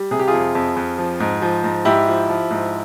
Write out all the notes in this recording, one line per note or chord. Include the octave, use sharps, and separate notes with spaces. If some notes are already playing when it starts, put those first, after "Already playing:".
Already playing: G3
C3 G#4
G4
F4 G#4
F2
F2
F2
F3
G#2
F3
G#2
G#2 E4 G4
F3
F3
G#2